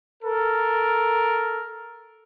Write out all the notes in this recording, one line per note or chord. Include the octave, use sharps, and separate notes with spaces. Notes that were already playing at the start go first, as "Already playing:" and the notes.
A4 A#4